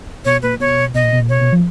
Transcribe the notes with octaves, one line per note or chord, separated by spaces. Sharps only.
B2 C#5
A#2 B4
B2 C#5
B2 D#5
A#2
B2
A#2
B2 C#5
B2
F3